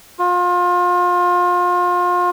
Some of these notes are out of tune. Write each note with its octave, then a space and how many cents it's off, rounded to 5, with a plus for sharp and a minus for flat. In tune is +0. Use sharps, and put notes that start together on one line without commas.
F4 +30